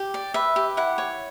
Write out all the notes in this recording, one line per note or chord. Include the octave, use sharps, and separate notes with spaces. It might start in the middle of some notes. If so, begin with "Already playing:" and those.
Already playing: G4
D5
B4 E5
G4
E4 F#5
C#5